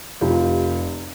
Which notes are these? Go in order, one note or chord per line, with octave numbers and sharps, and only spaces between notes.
F1 F4 G4